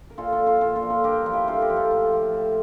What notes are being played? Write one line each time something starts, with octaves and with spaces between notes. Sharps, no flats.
A#4
A#2 F4 A4
F4 A4
F3
F4 A4
A#2 F4 A4
F4 A4
F3
F4 A4
G2 G4 A#4
F3
E4 G4
G2 F4 A4
G4 A#4
F3
F4 A4
A2
F3
A2